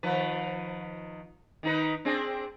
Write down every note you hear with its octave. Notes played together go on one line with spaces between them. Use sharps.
D#3 F3 B4
D#3 D#4 B4
C4 D4 G#4